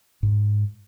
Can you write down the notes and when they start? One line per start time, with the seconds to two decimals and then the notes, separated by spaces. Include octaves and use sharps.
0.23 G#2